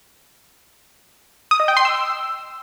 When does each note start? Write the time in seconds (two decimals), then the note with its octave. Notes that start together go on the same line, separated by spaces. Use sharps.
1.51 D#6
1.60 D#5
1.68 G5
1.77 C6
1.85 E6